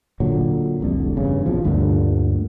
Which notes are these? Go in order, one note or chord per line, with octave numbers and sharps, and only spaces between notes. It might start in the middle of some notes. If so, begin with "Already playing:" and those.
A#2 D3 F#3
F1 C2 D3
E2 G2 C#3
A#1 E2 B2 F3
D2 G2 A#2 D3